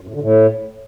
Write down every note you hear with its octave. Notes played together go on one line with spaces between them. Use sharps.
F#2
A2
D3
A2